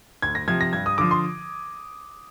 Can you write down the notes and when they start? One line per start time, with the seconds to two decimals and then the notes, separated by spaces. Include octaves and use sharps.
0.22 D2 G#6
0.35 A#6
0.48 C3 F3 G#6
0.61 A#6
0.73 G2 G#6
0.86 D#6
0.98 D3 F3 D6
1.11 C6